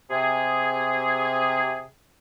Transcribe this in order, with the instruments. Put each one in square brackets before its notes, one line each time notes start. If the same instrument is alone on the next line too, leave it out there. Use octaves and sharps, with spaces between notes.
[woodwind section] C3 G#4